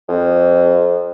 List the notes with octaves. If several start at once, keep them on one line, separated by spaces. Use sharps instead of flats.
F2